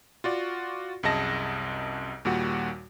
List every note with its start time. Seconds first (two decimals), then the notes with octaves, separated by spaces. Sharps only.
0.24 F4 F#4 D5
1.03 C2 F#2 G#4 D#5 A5 A#6
2.25 D#2 A#2 G3 F#4 F#5